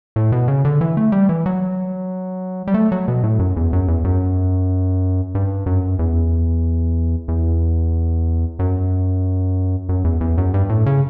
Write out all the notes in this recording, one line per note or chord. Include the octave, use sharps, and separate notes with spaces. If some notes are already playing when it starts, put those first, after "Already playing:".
A2
B2
C#3
D3
E3
A3
G3
E3
F#3
G3
A3
F#3
B2
A2
F#2
E2
F#2
E2
F#2
G2
F#2
E2
E2
F#2
F#2
E2
E2
F#2
G2
A2
C#3